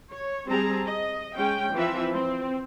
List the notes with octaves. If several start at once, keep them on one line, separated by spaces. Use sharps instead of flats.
C#5
G3 C4 G#4 A5 A#5
D#5
G#3 C#4 G5
E3 F3 C4 B4 E5
C4